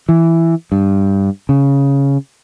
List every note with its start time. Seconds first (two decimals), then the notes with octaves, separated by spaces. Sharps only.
0.09 E3
0.72 G2
1.49 C#3